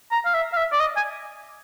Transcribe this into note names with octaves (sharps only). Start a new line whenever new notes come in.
A#5
F5
E5
F5
E5
D5
D#5
G#5